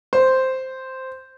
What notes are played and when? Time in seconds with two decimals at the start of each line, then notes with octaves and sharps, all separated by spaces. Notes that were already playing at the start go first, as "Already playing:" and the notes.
0.13 C5